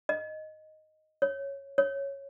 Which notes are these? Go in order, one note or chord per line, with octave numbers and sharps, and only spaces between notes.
D#5
C#5
C#5